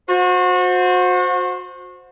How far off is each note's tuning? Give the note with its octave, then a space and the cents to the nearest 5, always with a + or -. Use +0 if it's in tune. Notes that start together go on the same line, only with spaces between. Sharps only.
F#4 -30 C5 +0